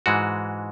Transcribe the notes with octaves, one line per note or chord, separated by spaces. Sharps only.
G#2 E3 G#3 F#4